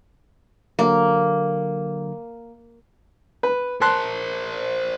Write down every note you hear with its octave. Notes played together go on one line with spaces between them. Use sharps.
D3 F#3 A#3
B4
A#4 C5 A5 C6 F#6